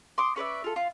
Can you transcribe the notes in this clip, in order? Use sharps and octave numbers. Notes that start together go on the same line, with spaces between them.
C6 D6 D#6
C#4 B4 D5 E5
F4 A4
F4